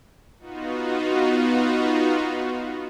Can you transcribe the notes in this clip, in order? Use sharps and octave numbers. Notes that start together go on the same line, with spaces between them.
B3 D#4 F4 F#4